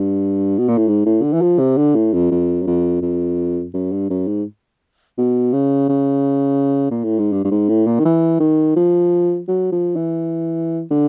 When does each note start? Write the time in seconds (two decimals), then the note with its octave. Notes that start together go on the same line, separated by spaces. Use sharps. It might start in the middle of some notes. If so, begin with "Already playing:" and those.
Already playing: G2
0.58 B2
0.68 A#2
0.78 A2
0.88 G#2
1.06 A2
1.23 D3
1.33 E3
1.42 F3
1.59 C3
1.77 D3
1.95 A2
2.13 F2
2.31 F2
2.62 F#2
2.67 F2
3.02 F2
3.74 F#2
3.92 G2
4.10 F#2
4.27 G#2
5.18 B2
5.53 C#3
5.89 C#3
6.91 A#2
7.04 A2
7.19 G#2
7.32 G2
7.44 G2
7.51 G#2
7.69 A2
7.87 A#2
7.99 D#3
8.05 E3
8.40 D#3
8.76 F3
9.48 F#3
9.72 F3
9.96 E3
10.91 D3